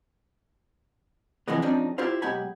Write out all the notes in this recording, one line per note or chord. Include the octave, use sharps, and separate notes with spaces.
C3 E3 F3 G#3 B3
C#3 F3 C4 D4 D#4
E4 F4 G4 C5 F5
B1 G#3 G4 F#5 G#5 B5